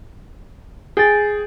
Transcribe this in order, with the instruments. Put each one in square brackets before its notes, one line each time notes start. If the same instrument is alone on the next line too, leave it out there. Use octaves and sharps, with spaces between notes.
[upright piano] G#4 [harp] G5 A6